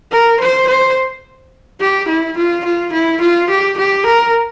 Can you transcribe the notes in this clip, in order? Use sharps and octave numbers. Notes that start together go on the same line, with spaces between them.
A#4
C5
C5
G4
E4
F4
F4
E4
F4
G4
G4
A#4